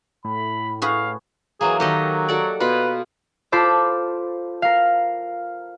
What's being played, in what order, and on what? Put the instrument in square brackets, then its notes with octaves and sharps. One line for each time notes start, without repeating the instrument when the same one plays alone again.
[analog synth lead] A2 [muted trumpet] B5
[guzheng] F#4 G#4 B4 [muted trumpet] F5
[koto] E3 F#3 A#3 [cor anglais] G#4
[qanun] D#3 A4 [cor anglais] F#3 [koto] G4 D#5
[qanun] F#4 A4 D5
[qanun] B2 B5 [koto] F4 [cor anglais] B4
[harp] F4 A4 C5 B5 D6
A#4 F5